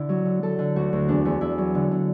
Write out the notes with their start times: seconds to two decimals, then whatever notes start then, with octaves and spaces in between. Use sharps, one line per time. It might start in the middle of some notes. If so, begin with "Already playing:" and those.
Already playing: D3 E4
0.09 F#3
0.26 D3
0.42 F#3 A4
0.59 D3
0.76 D2 F#4
0.93 D2
1.08 E2 D4
1.25 E2
1.41 E2 E4
1.58 F#3
1.75 D3
1.91 D3